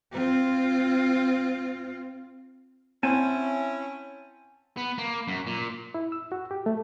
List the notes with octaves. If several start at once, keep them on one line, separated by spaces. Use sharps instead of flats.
C4 F4
C4 C#4 E4 F#5 G#5 A5
B3
A#3
F#2
A#2
E4
E6
F#4
G4
A3